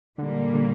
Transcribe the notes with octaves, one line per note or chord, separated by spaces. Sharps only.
A#2 D3 G3 A#3
D3